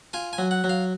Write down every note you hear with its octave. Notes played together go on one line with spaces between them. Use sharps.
F4 G#5
G#5
F#3
F#5
F#3
F5